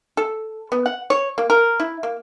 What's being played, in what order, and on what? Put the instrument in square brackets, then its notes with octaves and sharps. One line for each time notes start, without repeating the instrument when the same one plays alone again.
[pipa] A4
B3
F#5
C#5
A#3
A#4
E4
A#3